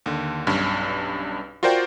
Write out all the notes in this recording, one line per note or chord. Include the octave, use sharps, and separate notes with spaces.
D#2 D3
B1 G2 C#4
F4 F#4 A#4 C5 D5 G5